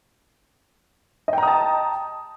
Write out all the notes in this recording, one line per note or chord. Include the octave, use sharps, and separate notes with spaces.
D#5 G5 A5 A#5 D#6